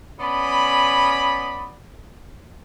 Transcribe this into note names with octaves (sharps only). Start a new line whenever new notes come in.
B3 C#4 D5 D#5 B5